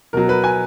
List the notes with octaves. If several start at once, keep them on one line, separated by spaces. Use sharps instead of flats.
B2 F#3 A#4
B4
G#5